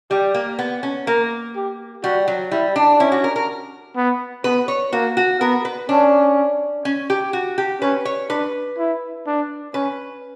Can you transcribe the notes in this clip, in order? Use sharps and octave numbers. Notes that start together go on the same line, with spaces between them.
G3 G4
A#3
B3
C#4
A#3 A#4
G4
G3 F#4
F#3
G3 E4
D4
C#4 E4
F#4
A#4
A#4
B3
B3 B4
C#5
A#3 F#4
F#4
B3 A#4
B4
C#4 D4
C#4
G4
F#4
G4
C#4 B4
C#5
D4 B4
E4
D4
C#4 B4